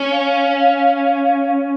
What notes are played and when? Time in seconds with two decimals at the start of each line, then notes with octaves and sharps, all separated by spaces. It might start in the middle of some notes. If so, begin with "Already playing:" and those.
Already playing: C#4
0.11 F5